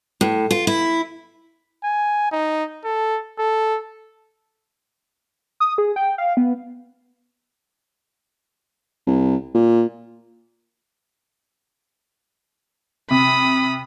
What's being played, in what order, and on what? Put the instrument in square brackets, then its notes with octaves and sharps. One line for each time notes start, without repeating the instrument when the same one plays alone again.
[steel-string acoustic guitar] A2
F4
E4
[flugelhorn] G#5
D#4
A4
A4
[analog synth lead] D#6
G#4
G5
F5
B3
[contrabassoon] C2
A#2
[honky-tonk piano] C3 [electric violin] B5 D#6